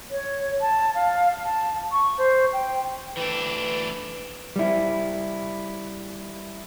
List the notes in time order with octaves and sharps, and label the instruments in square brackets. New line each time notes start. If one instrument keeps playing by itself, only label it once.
[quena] C#5
A5
F5
A5
C#6
C5
G5
[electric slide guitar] E3 A3 D4 [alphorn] B4
[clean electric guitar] G3 E4